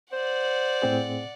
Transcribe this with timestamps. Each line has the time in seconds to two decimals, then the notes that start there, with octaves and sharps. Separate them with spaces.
0.13 C5 D5 F#5
0.82 A2 C4 G#4